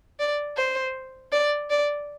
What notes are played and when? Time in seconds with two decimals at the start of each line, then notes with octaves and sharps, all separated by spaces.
0.19 D5
0.56 C5
1.32 D5
1.70 D5